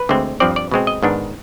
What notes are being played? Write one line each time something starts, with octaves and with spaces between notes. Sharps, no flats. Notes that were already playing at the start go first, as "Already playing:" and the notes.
Already playing: B4
D2 D3 G#3 C4
G2 F3 C4 D5
D5
B2 G#3 C4
D#5
G#2 D#3 B3 D4